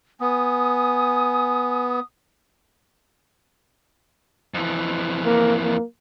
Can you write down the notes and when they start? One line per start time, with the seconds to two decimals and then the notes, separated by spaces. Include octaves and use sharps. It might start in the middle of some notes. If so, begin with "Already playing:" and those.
0.21 B3 G#5 D#6
4.54 F2 E3
5.25 A#3
5.61 A#3